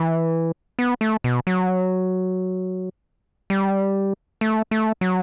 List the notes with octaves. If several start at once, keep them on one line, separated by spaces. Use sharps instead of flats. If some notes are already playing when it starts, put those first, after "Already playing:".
Already playing: E3
B3
A3
B2
F#3
G3
A3
A3
F#3